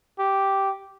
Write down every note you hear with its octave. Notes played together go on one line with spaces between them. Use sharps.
G4